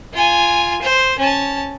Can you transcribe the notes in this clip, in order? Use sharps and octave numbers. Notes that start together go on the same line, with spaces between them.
F4 G#5
C5
C#4 A5